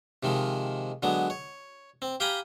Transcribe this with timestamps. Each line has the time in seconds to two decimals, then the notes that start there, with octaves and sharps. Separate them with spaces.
0.23 C3 D#3 F3 G#3
1.03 D3 F#3 G#3 B3
1.30 C#5
2.02 C4
2.20 G4 F5 G5 G#5 A#5 B5